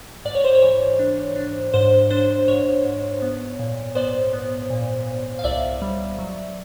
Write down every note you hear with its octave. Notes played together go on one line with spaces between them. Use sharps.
G#2 D5
C#5
C5
C#5
E3
D4
D4
G#2 C5
D4 C5
G#2 C#5
G#2
B3
A#2
B3 C5 D5
B3
A#2
A#2
F5
C2 D5 E5
G3
F#3